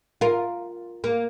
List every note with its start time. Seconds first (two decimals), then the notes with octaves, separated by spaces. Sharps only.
0.21 F4 A#4
1.04 A#3